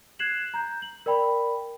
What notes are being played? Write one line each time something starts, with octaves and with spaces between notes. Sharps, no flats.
F#6 G#6 C7 E7 F#7
A#5 G6
F#7
A#4 D5 G5 B5